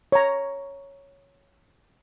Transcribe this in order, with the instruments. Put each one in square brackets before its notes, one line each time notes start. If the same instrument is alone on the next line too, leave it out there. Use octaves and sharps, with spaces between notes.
[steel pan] C#5 A#5